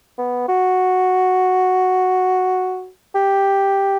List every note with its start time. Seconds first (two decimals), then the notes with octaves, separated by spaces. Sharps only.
0.18 B3
0.48 F#4
3.15 G4